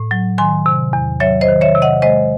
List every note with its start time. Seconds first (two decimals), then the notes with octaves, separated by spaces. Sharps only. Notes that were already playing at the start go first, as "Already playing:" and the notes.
Already playing: A2
0.11 F#3
0.38 D#3 G#5 C6
0.66 C3
0.93 E2
1.20 F#3 C#5 E5
1.41 C5 D#5
1.48 D#3
1.61 C#5 E5
1.75 C3
1.82 D#5 F#5
2.02 G#3 C5 D#5